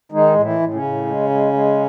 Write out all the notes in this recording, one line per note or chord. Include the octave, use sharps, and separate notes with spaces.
D#3 G#3 D#4
A2
E3 E4
A2
C#3 C#4
A2
G#3
G#3
G#3